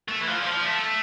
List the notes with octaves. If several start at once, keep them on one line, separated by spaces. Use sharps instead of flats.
A3
E3
F3
G3
F3
A3